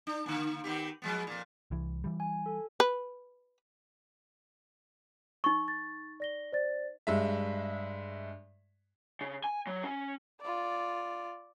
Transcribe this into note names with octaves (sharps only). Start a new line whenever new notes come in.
D4
D3 A#3
D#3 B3 G4
F3 G#3 B3
F2 A#2
C2 E3
E3 G3
G#5
A4
B4
D#4 C#6
A6
D5 A#6 G7
C5 D5 A6
G2 G#3 E5
C#3
G#5
F#3
C#4
F4 D5